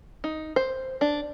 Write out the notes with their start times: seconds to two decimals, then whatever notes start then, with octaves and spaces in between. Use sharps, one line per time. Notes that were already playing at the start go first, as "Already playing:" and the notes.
0.24 D#4
0.56 C5
1.01 D4